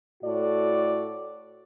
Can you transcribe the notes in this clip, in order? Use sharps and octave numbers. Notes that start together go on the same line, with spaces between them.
A2 F#4 A4 D5